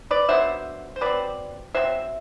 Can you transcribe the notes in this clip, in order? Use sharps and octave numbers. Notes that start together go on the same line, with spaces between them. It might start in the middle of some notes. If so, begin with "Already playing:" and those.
B4 D5
D3 F#3 B3 C5 E5
C5
F#3 C4 B4 D5
F#3 C4 C5 E5